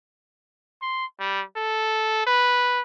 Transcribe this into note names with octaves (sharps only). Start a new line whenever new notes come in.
C6
G3
A4
B4